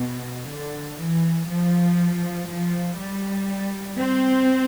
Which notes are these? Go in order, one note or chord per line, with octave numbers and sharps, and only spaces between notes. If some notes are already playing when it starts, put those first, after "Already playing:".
Already playing: B2
D3
E3
F3
F3
G3
C4